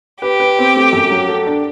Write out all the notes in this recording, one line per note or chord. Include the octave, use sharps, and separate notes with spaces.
G4 B4
B4
C4
A3
F#2
F#3
A4
D4